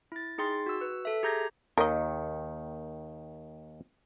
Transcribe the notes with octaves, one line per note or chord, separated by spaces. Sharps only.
E4 A6
D#4 G#4 G5 C6 A6
F#4 E6
B4 E6
A4 E5
G4 G#4 A#5 G6 G#6 A#6
D#2 D#3 A#4 D#5